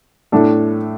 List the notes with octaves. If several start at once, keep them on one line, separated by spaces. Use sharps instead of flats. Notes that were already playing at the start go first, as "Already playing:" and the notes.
A2 A3 D4 A4